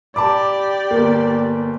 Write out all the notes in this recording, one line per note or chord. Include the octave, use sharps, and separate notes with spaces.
G4 D5 A5 B5 D6
G1 A#3